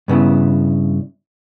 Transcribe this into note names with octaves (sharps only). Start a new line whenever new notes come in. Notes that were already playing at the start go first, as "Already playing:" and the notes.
G2 C#3 B3 E4